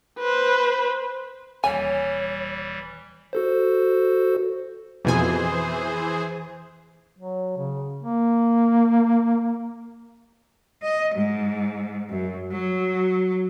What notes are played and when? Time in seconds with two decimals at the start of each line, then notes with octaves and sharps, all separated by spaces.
0.19 B4 C5
1.64 D#1 E3 G3 C#5 G#5
3.33 F#4 A4 C5
5.05 F2 B2 E3 G#4 C5 G#5
7.19 F#3
7.57 C#3
8.03 A#3
10.82 D#5
11.15 G#2
12.09 F#2
12.52 F#3